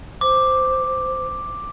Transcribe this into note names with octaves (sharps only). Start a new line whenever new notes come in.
C5 D6